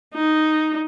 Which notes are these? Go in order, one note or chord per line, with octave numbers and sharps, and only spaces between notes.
D#4